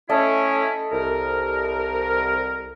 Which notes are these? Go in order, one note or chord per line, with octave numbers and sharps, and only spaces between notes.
A3 C#4 E4 A4 D#5 A5
C2 A#4